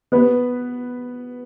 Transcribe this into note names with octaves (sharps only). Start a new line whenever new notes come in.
B3 B4